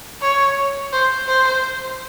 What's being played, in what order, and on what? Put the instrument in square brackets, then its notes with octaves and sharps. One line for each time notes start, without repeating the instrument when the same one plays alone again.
[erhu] C#5
C5
C5